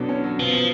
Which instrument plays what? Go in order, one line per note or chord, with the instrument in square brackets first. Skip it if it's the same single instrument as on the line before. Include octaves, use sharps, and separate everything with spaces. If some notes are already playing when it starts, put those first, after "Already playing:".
Already playing: [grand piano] B2 F#3 [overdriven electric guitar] D3
[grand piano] C#4
F#3
[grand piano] B2 [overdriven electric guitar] F3
[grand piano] B2